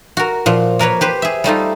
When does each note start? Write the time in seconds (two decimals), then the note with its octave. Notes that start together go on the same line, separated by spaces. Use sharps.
0.17 F#4 A#4
0.46 A#2 F3
0.79 A#3 A#4 B4 C#5
1.01 G4 B4 C5
1.22 G#4 E5
1.44 G3 A3 D#4 F4